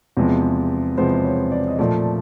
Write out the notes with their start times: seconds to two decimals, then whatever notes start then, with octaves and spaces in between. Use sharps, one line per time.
0.17 E2 C3 F3 G#3 B3
0.97 E2 C3 F3 G#3 B3 C5
1.25 C#5
1.52 D5
1.68 D#5
1.79 A#2 F3 A3 D5